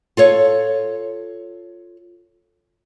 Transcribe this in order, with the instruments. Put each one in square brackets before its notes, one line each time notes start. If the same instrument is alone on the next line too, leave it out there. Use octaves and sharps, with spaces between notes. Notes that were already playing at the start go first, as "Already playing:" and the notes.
[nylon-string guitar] F4 A4 C#5